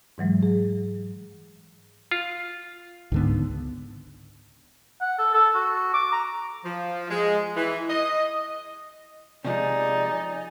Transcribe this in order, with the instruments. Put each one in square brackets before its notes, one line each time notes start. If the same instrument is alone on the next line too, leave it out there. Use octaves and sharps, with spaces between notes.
[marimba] G#2 E3 F#3 G#3
G#4
[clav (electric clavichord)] F4
[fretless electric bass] C#2 D3 B3 [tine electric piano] G#2
[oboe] F#5
A4
A4
F#4
D6
A#5
[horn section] F3
G#3
E3
D#5
[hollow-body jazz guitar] C3 F3 G#3 [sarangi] D#4 [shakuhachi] D5 [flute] G#5